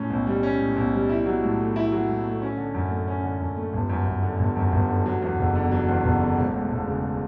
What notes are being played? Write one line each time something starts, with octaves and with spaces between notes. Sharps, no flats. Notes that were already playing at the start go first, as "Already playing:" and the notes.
Already playing: A2 C#4
B1
G3
C#4
A2
B1
G3
E4
F#3
A2
A3
E4
F#3
A2
A3
C#4
D3
F#2
A3
C#4
D3
F#2
A3
G1
F#2
G1
D3
G1
F#2
G1
D3
F#3
E2
F#1
D3
F#3
E2
F#1
D3
E1
D2
E1
C#3